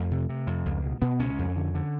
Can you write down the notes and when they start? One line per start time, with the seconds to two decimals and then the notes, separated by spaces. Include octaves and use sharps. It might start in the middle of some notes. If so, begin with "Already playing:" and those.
Already playing: F2 A3
0.11 C3
0.29 C3
0.47 F2
0.66 C#2
0.84 B2
1.02 B2 B3
1.19 C#2 C#4
1.39 F2
1.56 D3
1.75 D3